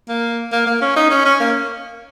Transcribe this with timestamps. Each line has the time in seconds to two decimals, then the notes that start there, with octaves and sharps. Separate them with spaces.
0.09 A#3
0.52 A#3
0.66 A#3
0.81 C#4
0.96 D#4
1.10 C#4
1.25 C#4
1.40 A#3